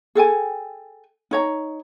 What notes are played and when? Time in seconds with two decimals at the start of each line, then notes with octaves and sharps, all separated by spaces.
0.15 G#4 A4 G5 G#5
1.31 D#4 C#5 A#5